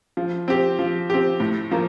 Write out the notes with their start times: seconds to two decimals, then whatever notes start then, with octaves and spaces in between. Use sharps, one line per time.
0.17 F3
0.48 C4 G4
0.79 F3
1.10 C4 G4
1.40 A2
1.71 F3 A#3